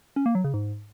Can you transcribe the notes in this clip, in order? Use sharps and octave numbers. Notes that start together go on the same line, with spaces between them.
C#4
A#3
F#3
C#3
G#2